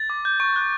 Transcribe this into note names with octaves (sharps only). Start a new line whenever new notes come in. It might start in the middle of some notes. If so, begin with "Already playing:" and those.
Already playing: A6
D6
G6
C#6
F#6